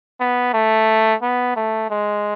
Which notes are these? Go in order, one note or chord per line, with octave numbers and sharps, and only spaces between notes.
B3
A3
B3
A3
G#3